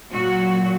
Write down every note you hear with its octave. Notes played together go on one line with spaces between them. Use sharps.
A#2 F#3 F#4